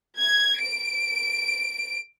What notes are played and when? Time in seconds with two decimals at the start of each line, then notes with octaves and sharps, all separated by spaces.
0.17 G#6
0.58 D7